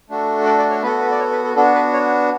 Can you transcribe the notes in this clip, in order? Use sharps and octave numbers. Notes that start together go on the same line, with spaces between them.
A3 D4 F#4 A4
D5
D5
C#5
B3 F#4 A4 B4
B4
D5
C#5
B4
A4
B3 D4 F#4 A4
B4
C#5